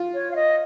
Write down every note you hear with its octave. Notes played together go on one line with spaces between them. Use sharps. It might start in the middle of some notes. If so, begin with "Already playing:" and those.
Already playing: F4
C#5
F5
D#5